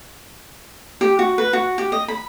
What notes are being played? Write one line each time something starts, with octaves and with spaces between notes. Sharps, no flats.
G4
F#4
B4
F#4
G4
D#5
B5